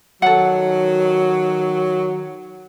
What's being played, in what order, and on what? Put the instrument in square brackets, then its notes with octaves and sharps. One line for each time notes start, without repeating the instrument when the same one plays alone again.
[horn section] D#3 F#3 [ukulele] A4 F#5